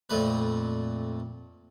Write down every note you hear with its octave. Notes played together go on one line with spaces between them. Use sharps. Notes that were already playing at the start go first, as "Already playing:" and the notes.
F2 A#2 A3 B4